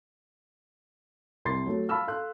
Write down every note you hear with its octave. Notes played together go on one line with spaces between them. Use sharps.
C2 C6 A6 C7
F#3 A3
F5 A5 B5 C#6 E6 F6
A4 F5 C6 F#6